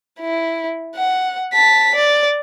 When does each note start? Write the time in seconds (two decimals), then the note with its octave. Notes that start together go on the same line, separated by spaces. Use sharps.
0.20 E4
0.96 F#5
1.53 A5 B6
1.95 D5